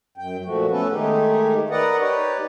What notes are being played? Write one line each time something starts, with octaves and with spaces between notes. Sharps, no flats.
F#2 G5
A#2 F3 A3 F#4
A3 B3 C#4 A4 B4
D#3 G#3 A3 D#4 G4 G#4
A#4 B4 D5 D#5 F#5
D#4 G4 B4 C#5 D5